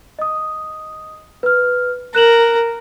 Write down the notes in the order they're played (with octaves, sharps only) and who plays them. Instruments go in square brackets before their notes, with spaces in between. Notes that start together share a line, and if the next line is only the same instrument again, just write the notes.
[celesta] D#5 D#6
B4 F6
[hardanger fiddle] A#4 [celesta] F#6 E7 F#7